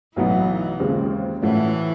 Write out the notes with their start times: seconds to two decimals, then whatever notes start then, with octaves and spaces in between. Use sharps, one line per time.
0.15 B1 A2 E3 F#3 B3 D#4
0.79 D#2 C#3 F3 G#3 C4
1.42 A2 E3 F3 A3 C#4 F#4